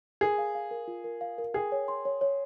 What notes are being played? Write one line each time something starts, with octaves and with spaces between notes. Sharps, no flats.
G#4 A#4
F5
F5
A#4
F4
A#4
F5
A#4
G#4 G5
C#5
C6
C#5
C#5